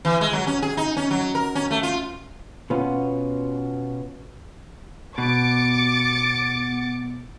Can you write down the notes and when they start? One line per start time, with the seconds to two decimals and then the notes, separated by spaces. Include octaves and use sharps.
0.05 E3
0.21 G#3
0.33 F#3
0.47 C#4
0.62 G#4
0.77 D#4
0.97 C#4
1.11 F#3
1.35 A#4
1.55 C#4
1.71 A3
1.83 F4
2.70 B2 B3 C#4 F4
5.18 B2 B3 D6 A6 C#7